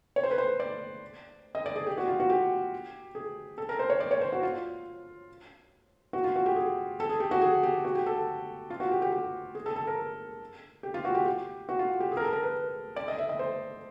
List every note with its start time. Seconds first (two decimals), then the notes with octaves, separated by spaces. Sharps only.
0.16 C#5
0.23 C5
0.31 B4
0.38 C5
0.60 D5
1.55 D#5
1.66 D5
1.76 G#4
1.87 G4
1.98 F#4
2.08 F4
2.20 F#4
2.30 G4
3.15 G#4
3.58 A4
3.69 A#4
3.79 C5
3.90 C#5
4.00 D5
4.11 C#5
4.21 C5
4.32 F#4
4.43 F4
6.13 F#4
6.24 F4
6.36 F#4
6.46 G4
6.56 G#4
7.00 A4
7.09 G#4
7.20 G4
7.31 F#4
7.41 G#4
7.63 G4
7.85 F#4
7.95 G4
8.06 A4
8.70 F4
8.80 F#4
8.91 G4
9.02 G4
9.12 G4
9.55 G#4
9.66 A4
9.76 A4
9.87 A#4
10.83 G4
10.94 F4
11.05 F#4
11.15 G4
11.25 G4
11.69 F#4
11.79 F4
12.00 G4
12.12 G#4
12.17 A#4
12.22 A4
12.33 A#4
12.43 B4
12.96 D5
13.08 D#5
13.18 E5
13.29 D#5
13.39 C5